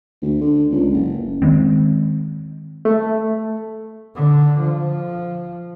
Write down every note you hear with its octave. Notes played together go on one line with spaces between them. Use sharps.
D2
D3
C#2
F#1
D#3 F3 G#3 C4
A3
D3
F3